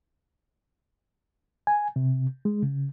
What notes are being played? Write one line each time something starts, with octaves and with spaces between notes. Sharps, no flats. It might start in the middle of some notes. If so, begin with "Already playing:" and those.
G#5
C3
G#3
C#3